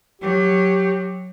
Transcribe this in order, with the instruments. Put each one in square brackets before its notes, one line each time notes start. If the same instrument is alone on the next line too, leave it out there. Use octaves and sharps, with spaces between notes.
[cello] F#3 [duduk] G4